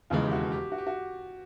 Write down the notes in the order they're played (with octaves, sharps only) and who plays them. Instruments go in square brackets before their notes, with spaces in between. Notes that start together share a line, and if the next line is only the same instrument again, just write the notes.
[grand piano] E1 D#2 C#3 E3 G#3 [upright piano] F4
[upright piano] G4
F#4
G4
F#4
G4
F#4